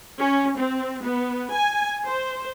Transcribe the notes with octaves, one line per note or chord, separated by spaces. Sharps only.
C#4
C4
B3
G#5
C5